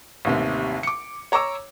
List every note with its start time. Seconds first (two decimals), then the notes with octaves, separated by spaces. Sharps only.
0.25 A1 D#2 C3
0.83 D6 C#7
1.32 C#5 A#5 C#6 D6 E6